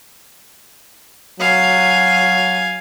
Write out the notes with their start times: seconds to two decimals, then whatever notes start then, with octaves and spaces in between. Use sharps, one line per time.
1.40 F#3 F5 G#5